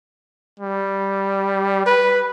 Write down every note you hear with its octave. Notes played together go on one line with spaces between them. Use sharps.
G3
B4